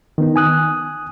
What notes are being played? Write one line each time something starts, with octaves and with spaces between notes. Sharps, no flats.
D#3 B3 D#4
G#5 D#6 F#6